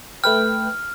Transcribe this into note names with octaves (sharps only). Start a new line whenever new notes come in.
A3 B4 G5 F6